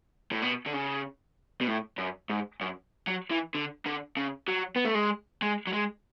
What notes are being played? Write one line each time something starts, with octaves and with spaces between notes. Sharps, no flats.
A2
B2
D3
C#3
B2
A2
F#2
G#2
F#2
F#3
E3
D3
D3
C#3
F#3
B3
A3
G#3
G#3
F#3
G#3